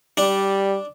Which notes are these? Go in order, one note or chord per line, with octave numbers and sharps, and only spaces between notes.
G3 D4